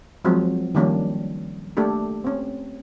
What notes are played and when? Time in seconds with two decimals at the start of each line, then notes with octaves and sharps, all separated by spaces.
0.25 F3 F#3 G#3 C4
0.75 D#3 F3 G3 A#3 C#4 D4
1.77 A3 A#3 D4 G4 A4
2.24 C4 C#4